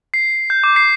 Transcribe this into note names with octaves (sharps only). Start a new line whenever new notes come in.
C7
G6
D6
C7